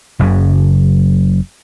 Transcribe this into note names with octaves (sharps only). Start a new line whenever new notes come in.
F#1 F#2 C#3